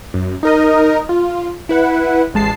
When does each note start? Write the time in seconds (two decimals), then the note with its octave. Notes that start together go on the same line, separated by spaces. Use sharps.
0.14 F#2
0.43 D#4 A#4 D#5
1.09 F4
1.69 E4 B4 F#5
2.34 A1 G#3 A5 C7